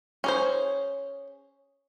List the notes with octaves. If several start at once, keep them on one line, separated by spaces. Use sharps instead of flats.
C#4 G#4 C5